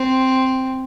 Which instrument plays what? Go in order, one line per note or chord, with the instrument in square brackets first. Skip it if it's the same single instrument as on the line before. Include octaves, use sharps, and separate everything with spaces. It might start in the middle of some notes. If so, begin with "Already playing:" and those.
Already playing: [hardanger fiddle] C4